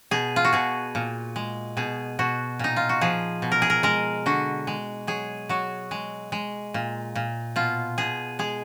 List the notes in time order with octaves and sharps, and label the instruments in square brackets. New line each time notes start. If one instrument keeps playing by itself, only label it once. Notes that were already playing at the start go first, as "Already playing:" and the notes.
[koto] B2 G#4
F4
F#4
B2 G#4
A#2
G#3
B2 G#4
B2 F#4
A#2 D#4
F4
F#4
F3 G#4
B2
A#4
G#4
A#4
G#3 A#4
D3 F#4
G#3
F#3 G#4
F#3 F#4
G#3
G#3
A#2
A#2
B2 F4
B2 G#4
G#3 G#4